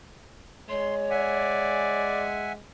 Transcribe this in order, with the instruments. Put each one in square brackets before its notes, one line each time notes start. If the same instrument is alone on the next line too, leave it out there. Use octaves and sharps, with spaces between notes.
[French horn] G#3 [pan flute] C#5 [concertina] C6
[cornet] D5 [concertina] E5 F#5 G#5